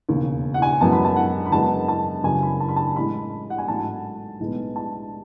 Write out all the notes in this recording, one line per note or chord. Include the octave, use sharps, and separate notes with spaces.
E1 D#2 C#3
F#5
G#5
F#2 E3 G#3 B3 A5
B5
A5
F#5
B5
F#1 F#2 E3 G#3 B3 A5
A5
F#2 C#3 E3 G#5
B5
A5
B5
A5
A1 A2 G#3 B5
F#5
G#5
A1 G#2 F#3 A3 A5
B1 A2 E3 G#3 B3
A5